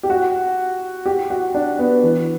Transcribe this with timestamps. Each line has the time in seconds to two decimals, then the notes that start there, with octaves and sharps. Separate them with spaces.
0.03 G4
0.10 F#4
1.06 G4
1.30 F#4
1.54 D4
1.79 B3
2.03 E3